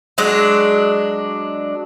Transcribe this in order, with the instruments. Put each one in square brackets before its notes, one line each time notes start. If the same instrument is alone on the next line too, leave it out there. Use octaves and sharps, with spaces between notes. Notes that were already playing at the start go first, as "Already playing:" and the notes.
[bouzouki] F#3 G#3 D4